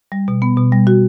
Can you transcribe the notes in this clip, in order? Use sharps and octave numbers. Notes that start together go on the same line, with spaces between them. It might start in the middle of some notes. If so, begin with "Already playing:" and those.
G3
B2
B3
B2
G3
F#4